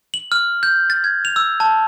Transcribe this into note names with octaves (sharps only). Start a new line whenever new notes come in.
F#7
F6
G6
A6
G#6
F7
E6
A5